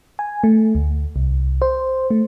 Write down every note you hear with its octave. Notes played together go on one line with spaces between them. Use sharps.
G#5
A3
D2
C2
C5
A3